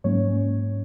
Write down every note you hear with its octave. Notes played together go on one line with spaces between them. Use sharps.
G#2 F#3 A#3 C#4 C#5